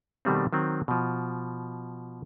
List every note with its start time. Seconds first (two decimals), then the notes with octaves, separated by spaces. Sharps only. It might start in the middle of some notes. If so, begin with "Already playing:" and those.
0.25 B2 D#3 G3 A3 C4
0.53 D#3 F#3 C4
0.88 B2 F3